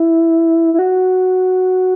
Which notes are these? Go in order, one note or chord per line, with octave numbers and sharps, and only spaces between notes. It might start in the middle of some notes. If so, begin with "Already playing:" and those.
Already playing: E4
E4
F#4